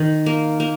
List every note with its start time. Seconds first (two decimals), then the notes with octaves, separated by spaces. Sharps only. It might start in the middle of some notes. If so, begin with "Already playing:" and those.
Already playing: D#3
0.26 A#3
0.60 A#3